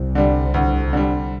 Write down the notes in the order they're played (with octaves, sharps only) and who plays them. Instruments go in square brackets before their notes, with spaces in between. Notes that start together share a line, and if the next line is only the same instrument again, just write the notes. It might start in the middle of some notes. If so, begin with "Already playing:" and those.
Already playing: [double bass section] C2 C3
[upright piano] D3 G3
D2
D3 G3